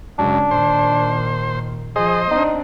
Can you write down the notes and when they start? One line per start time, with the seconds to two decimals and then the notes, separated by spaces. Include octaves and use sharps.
0.19 F#2 C#3 G#3 D4
0.51 A#2 D#3 C5
1.96 F3 G#4 C5 D#5
2.31 C4 D4 D#4